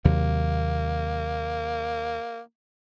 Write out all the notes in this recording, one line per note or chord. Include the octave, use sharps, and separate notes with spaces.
D#2 C3 F#3 A#3